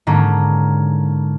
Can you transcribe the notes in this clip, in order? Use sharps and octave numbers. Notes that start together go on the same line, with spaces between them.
G#2 D3 A#3 C#4